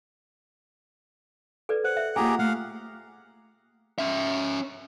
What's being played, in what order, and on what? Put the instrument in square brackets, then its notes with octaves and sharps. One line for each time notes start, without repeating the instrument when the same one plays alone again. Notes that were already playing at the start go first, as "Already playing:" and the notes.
[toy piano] A4 B4 D5
[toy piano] C5 [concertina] F#5
[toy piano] E5
[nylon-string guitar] A#3 F4 F#5 [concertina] G4 G#4 A#5 [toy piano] G#5
[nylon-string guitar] A3 [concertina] F5 F#5
[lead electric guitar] C#4 E5